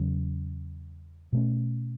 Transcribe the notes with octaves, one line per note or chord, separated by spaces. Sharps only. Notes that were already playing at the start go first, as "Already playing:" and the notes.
Already playing: E2 C#3 F#3 C#4
B2 A3 C#4